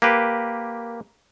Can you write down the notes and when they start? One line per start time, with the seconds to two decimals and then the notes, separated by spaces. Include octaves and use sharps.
0.02 A#3 G4 B4